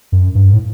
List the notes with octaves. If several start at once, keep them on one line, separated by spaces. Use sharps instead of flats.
F#2
G2
A2